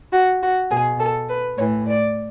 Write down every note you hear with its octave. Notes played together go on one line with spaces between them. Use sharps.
F#4
F#4
B2 G#4
A4
B4
A2 E3 C#5
D5